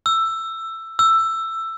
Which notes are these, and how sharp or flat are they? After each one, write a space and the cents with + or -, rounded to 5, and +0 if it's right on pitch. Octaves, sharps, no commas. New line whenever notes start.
E6 +10
E6 +10